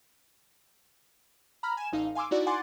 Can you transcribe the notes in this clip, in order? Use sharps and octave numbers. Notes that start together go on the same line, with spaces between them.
A#5 B5 F6
G#5 E7
A1 D#4 F5
F5 G#5 C6 D6 E6
D#4 E4 F#4 D5
F#5 G#5 C6 D6 A6